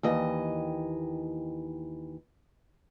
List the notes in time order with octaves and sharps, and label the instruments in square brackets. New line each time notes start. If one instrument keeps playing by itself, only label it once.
[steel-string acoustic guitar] D#2 E3 D#5